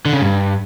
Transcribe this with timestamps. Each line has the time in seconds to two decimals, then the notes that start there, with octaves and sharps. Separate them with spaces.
0.05 D3
0.13 C#3
0.21 G2